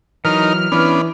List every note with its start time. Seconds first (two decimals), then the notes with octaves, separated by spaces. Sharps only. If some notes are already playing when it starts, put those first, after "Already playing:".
0.25 E3 F#3 D#4 A#4 F6
0.72 E3 B3 C#4 D4